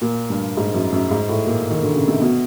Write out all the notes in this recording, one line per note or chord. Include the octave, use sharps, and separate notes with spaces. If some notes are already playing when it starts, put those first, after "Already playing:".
A#2
G2
G#2
F#2
F#2
G#2
A2
A#2
D#3
D3
C#3
C3
B2